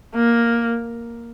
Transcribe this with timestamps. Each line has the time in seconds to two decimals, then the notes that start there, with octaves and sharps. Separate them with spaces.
0.15 A#3